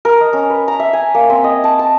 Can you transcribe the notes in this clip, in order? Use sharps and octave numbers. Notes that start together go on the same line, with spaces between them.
A#4
D#5
C#4
B4
A#5
E5
G#5
A#3
C4
D#5
A5
A5